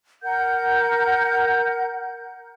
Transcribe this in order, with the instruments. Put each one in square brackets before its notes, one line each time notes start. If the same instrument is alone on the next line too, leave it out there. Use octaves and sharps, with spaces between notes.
[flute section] A#4 F#5 G6